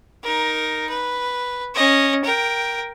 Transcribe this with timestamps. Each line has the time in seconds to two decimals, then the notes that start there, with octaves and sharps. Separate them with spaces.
0.24 D#4 A#4
0.89 B4
1.74 C#4 D#5
2.24 A#4 G5